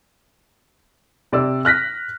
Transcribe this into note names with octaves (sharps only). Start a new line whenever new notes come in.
C3 D5 E6
F6 F#6 A#6 B6